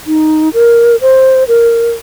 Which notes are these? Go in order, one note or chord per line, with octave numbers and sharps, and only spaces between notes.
D#4
A#4
C5
A#4